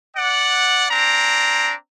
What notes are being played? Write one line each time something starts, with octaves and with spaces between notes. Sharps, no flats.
D5 F#5
C4 D4 A#5